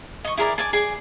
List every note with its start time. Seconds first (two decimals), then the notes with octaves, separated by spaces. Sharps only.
0.25 D#5 C#6
0.38 E4 G#4 A#4 D5
0.58 D5 G#5 A5
0.73 G#4 D5 G#5